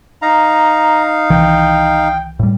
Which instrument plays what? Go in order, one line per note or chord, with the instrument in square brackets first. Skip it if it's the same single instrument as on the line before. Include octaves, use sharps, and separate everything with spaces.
[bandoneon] D#4 F5 [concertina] A#5
[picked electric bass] C2 D#3 E3 [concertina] G5
[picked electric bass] A2 G3